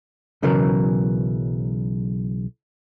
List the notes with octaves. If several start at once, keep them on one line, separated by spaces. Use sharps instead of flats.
B1 C#3 E3 F#3 A#4